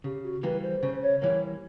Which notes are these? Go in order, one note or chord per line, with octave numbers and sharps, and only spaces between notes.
C#3 G4
F#4
E3 G3 A#3 B4
C5
C#3 C5
C#5
E3 G3 A#3 C#5